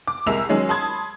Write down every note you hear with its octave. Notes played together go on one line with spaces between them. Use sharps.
D6
C2 G#3 A#4 E5 E6 F7
D#3 F#3 G#3 C#4
A5 B5 C6 D#6 G#6